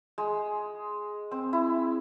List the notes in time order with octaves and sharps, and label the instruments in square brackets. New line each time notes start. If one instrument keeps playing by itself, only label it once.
[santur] G#3
C4
E4